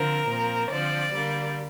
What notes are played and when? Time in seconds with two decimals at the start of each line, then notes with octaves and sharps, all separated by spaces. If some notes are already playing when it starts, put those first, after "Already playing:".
Already playing: D3 F3 C4 A#4
0.28 A#2 F3 C4
0.69 D3 F3 C4 D5
1.12 D3 G3 A#3